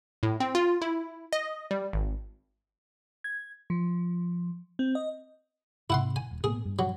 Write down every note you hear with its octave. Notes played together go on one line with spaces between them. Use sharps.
A2
C4
F4
E4
D#5
G3
G#1
G#6
F3
C4
D#5
G#2 C3 E4 F#5 C6
G#5
D#1
A2 A#3 B3 G#4
G2
F#3